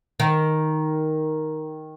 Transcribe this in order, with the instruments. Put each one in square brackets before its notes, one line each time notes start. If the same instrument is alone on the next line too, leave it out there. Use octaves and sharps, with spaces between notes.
[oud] D#3